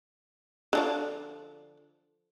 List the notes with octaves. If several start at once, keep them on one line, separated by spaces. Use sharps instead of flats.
D3 F3 D4